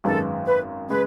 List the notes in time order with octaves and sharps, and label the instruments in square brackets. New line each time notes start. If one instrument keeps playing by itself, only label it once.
[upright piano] G#1 F#2 D#3 G#3 B3 [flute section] A4
[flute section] B4
[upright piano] C#3 G#3 [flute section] B4